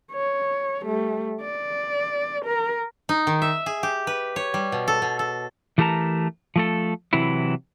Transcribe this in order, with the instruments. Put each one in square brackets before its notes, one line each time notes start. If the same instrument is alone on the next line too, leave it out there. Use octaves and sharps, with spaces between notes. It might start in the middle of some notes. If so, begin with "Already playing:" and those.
[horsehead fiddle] C#5
G3 A3
D5
A#4
[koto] D#4
D#3
E5
G#4
G4
B4
C#5
G3
B2
A4
B2
A4
[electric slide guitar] E3 A3 G4 A#4 A5 A#5
F3 A3 A4
C3 E3 F#3 E4